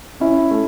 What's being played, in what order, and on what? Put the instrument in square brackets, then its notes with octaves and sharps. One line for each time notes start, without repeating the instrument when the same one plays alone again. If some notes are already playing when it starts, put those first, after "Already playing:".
[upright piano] C#4 [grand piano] E4
[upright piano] A3